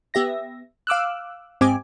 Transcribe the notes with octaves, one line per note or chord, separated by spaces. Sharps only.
B3 G4 E5 A#6
F5 D6 E6 F#6
G#2 C4 G4 G#5 D6